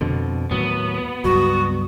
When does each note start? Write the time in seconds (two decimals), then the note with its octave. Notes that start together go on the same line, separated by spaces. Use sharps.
0.01 F2 B2 D3
0.51 D#2 A2 F#3 B3
1.24 C#2 G2 F#3 F#4